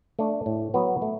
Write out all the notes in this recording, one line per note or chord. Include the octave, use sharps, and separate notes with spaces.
A3 D4
A2
F#3 B3
A3